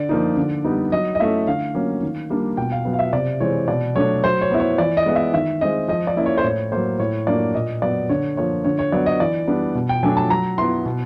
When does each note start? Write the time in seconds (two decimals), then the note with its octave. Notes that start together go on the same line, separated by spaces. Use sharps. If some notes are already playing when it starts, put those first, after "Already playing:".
Already playing: D3 D5
0.09 F3 A#3 D#4
0.37 D3
0.64 G3 B3 D#4
0.92 F#3 D#5
1.15 D#5
1.20 A3 C#4 E4 E5
1.47 D3 F5
1.74 F#3 A#3 C#4
2.02 D#3
2.30 G3 A#3 D4
2.57 B2 G5
2.72 F5
2.85 F#3 B3
2.93 F5
2.99 E5
3.13 C3 D5
3.40 E3 G#3 C4 C#5
3.68 B2 D5
3.95 F#3 A3 D4 C#5
4.23 F#3 C5
4.42 C#5
4.51 B3 E4
4.60 C#5
4.78 E3 D5
4.97 D#5
5.06 G#3 B3 E4
5.15 E5
5.34 D#3 E5
5.61 G#3 C4 D#5
5.88 F3 D#5
6.07 D5
6.17 A#3 C#4 E4
6.26 C#5
6.38 C5
6.44 A2 C#5
6.72 F#3 A#3 C5
6.99 A2 C#5
7.27 F#3 A#3 D4 D5
7.55 A#2 D#5
7.82 F#3 B3 D5
8.09 D3 C#5
8.37 F3 A#3 C#5
8.65 D3 C#5
8.79 C#5
8.92 F#3 B3 D5
9.06 D#5
9.20 E3 D5
9.47 G3 B3 D4
9.75 B2
9.89 G5
10.03 F#3 A3 D4 G#5
10.17 A5
10.30 F#3 A#5
10.58 B3 E4 C6
10.86 B2